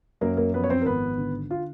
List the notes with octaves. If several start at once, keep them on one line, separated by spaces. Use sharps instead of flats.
F#2 A#3 A#4
A#3 A#4
F3 B3 B4
C#5
C4 C5
A#4
G#1 B3 B4
D3
F4